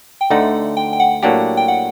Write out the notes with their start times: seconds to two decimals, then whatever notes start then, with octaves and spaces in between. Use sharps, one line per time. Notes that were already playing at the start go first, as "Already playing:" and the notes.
0.21 G5
0.30 D2 D3 A3 D#4 F#5
0.77 G5
0.93 G5
1.00 F#5
1.23 A2 F#3 A#3 D4 G4 F#5
1.57 G5
1.68 F#5